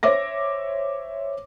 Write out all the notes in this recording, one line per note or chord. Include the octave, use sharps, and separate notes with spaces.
C5 C#5 E5 D6 A#6